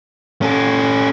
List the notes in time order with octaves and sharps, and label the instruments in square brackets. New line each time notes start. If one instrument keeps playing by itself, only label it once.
[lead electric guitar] C#4 A4